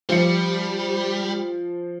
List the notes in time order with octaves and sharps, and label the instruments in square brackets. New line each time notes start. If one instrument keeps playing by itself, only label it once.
[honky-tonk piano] F3 F4 C#7 [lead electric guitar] G3